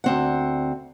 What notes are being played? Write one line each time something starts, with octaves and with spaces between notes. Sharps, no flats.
D2 C4 F#5